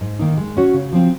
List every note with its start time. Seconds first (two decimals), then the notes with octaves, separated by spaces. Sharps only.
0.01 G#2
0.19 D#3 A#3 D#4
0.37 G#3
0.57 C#4 F#4 C#5
0.74 C#3
0.93 F3 C4